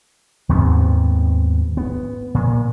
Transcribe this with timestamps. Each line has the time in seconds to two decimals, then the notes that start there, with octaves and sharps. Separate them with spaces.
0.49 D#2 G#2 B3 C4
1.77 B3
2.35 A#2